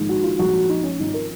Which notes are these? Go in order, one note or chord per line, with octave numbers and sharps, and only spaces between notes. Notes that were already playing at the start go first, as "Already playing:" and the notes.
Already playing: A#1 G#2 D#3
F#4
F4
A#1 G#2 F3 F#4
D#4
C#4
G#1 G#2 F3 D#4
A#4